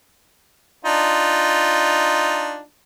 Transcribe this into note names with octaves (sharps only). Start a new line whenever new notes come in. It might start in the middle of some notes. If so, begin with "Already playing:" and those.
D4 D#4 F4